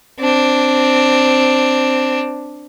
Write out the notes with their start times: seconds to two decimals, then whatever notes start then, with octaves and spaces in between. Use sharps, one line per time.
0.19 C4 D4